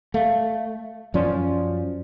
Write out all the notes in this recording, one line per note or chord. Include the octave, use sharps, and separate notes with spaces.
A3 F5
F#2 F3 C#4 D5 C6